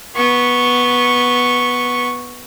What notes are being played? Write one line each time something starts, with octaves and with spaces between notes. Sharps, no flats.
B3 C#6